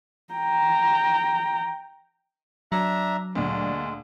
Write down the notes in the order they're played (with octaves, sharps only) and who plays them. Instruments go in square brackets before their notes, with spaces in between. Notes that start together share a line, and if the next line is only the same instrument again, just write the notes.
[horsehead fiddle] G5 A#5
[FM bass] F#3 [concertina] D4 E5 [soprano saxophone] A#5
[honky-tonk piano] D2 A#2 [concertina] G#3 [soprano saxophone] D4